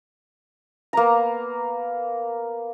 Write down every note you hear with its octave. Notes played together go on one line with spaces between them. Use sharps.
A#3 B3 A#5